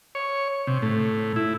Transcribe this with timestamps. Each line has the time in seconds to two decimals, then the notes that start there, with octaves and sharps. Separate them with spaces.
0.15 C#5
0.67 C3
0.82 A2
1.36 E4